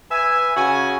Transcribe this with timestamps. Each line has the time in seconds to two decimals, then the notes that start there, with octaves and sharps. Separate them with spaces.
0.11 B4 E5 G#5
0.56 C#3 F#4 G#5